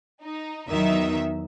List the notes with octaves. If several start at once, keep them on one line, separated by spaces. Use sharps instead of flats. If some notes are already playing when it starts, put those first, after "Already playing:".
D#4
E2 D#3 F#3 D#4 E5